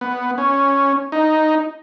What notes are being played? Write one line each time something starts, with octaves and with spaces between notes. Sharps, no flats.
B3
C#4
D#4